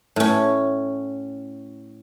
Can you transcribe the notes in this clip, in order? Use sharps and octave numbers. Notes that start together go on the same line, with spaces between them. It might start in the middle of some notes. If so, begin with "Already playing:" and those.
A2 C#4